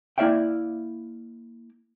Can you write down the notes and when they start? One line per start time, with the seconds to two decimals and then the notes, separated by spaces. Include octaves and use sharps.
0.18 A#3 E4 D5 E5 F5 G5